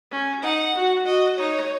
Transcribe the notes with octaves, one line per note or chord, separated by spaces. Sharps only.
C#4
D#4 F#5
F#4
F#4 D#5
D#4 C#5